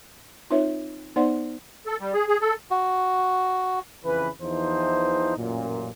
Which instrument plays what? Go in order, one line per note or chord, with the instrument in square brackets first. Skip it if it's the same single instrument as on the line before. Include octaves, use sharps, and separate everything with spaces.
[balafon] C4 D#4 F4 B4 C#5 E5
B3 D#4 C5 D5 F#5 C6
[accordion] A4
G3
G#4
G#4
A4
[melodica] F#4
[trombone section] F2 C#3 E3 B4
E2 E3 F3 D#4 C5
A1 F#2 A#2